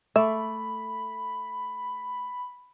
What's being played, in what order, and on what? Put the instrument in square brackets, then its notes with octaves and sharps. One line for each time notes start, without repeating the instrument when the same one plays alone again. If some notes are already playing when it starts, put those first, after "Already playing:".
[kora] A3 D5 [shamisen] E5 [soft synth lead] B5